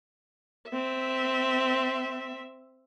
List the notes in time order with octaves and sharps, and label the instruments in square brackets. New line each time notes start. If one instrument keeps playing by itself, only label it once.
[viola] C4 E5